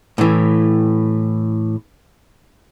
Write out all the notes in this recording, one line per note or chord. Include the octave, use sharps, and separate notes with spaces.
A2 E3